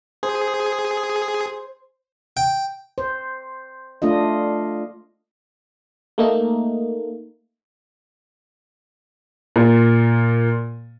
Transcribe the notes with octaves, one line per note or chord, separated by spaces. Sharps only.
G#4 C5
G5
C5
A3 D4 F4 D#5
A3 A#3 D#4
A#2